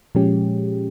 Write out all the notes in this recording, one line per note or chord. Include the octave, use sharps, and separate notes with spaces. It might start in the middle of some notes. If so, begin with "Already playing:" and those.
A#2 F3 G#3 C#4 G4